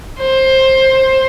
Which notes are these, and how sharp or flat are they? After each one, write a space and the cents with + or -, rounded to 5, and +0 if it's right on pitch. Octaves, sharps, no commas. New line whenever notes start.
C5 +15